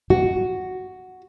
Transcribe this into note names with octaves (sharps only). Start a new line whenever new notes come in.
F#4